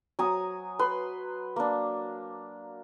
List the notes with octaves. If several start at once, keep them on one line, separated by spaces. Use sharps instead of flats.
F#3 G#5 A#5 D#6
B4 C6
A#3 D4